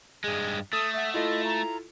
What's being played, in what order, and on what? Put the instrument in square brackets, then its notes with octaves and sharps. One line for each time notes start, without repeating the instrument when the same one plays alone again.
[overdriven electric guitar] G2 G#3 [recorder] G#4
[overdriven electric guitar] A3 [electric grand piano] A4 [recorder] D#6
[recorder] E5 [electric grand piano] F#5 D#6
[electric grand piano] E4 F4 A4 [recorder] D#5
[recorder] A#5